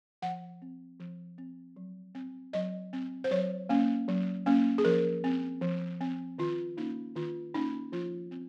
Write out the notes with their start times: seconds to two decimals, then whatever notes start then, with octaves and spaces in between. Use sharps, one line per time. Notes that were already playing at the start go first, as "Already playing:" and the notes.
0.22 F3 F#5
0.62 C4
1.00 F3
1.38 C4
1.76 F#3
2.15 C4
2.53 F#3 D#5
2.93 C4
3.24 C5
3.31 F#3 C#5
3.69 A#3 C#4
4.08 F#3
4.46 A#3 C#4
4.78 G#4
4.85 F3 A#4
5.24 C4
5.61 F3
6.01 C4
6.38 D#3 F4
6.77 A#3 C#4 D#4
7.15 D#3 F4
7.54 A#3 C#4 D#4
7.92 F3 F4
8.31 C4